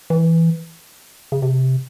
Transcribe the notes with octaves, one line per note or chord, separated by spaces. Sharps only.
E3
C#3
C3